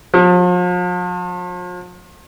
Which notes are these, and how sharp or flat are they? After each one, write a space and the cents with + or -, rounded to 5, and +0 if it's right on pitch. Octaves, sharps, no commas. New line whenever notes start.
F3 +40